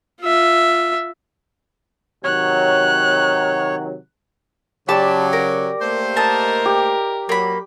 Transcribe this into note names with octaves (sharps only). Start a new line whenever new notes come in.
F4 E5
C3 D#3 F#3 C#5 F#6
C#3 F#3 G4 D5 A5 B5
A#4
A3 A#3 C5
A#4 D#5 A5
G4
F#3 A#3 B5